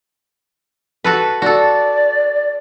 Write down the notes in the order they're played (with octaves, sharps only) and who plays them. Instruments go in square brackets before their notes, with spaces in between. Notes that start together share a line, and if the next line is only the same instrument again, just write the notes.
[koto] F#4 A4 B4
[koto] F#4 A4 [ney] D5